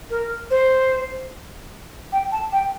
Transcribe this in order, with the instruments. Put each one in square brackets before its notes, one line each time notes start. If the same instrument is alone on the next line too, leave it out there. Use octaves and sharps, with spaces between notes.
[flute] A#4
C5
G5
A5
G5